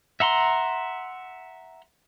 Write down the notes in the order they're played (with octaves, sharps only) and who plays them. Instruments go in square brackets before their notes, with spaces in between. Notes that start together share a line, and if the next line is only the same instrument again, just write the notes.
[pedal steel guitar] E5 F#5 A#5 C6